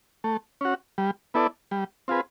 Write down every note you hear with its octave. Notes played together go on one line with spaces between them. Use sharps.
A3
C#4 F#4
G3
B3 E4 A4 D5
G3
C4 F4 G#4 B4